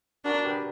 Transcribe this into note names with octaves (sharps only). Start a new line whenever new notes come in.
D4 F#4 A#4
A#4
G4 B4